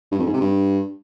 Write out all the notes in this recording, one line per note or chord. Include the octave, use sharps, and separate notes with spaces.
G2
F2
G#2
C3
G2